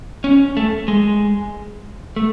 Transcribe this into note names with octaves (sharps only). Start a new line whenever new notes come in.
C#4
A3
G#3
A3